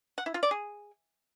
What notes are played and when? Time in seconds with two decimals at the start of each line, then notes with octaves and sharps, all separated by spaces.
0.18 F#5
0.26 E4
0.34 F4
0.43 D5
0.51 G#4